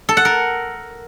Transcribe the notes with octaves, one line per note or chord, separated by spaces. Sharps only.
A4
F#5
A#4